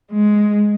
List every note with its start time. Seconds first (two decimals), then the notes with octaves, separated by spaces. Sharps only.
0.12 G#3